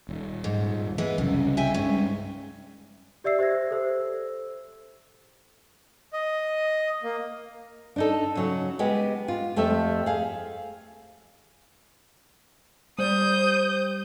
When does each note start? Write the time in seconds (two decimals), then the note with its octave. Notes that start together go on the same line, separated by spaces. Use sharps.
0.09 D#1
0.44 G#2
0.98 E3 G#3 B3
1.18 C2 F#2 C#3
1.57 E5 G5 G#5
1.74 G2 G#3 C#4
3.24 G4 D5 E5 E6 C7
3.39 G4 C5 E5 G#6 A#6
3.71 A4 C5 E6
6.13 D#5
7.03 A#3
7.96 D4 D#4 A4
8.35 C#3 F#3
8.79 G#3 B3 G4
9.28 F4
9.56 F2 A3 G4 A4 E5
10.06 G#4 F5
12.98 G3 C5 D#6 G6